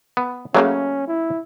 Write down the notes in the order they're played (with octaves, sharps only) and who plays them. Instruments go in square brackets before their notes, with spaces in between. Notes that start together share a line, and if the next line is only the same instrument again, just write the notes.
[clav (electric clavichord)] B3
[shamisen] C#3 F3 A3 [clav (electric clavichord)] F#3 A#3 [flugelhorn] C#4
[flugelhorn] E4